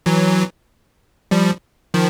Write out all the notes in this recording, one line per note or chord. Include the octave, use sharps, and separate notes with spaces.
E3 F#3
F3 G3
D#3 F3